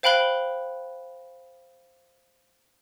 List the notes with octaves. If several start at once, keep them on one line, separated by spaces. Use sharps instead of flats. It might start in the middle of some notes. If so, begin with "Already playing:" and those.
C5 F5 G5 B5 F#6 G7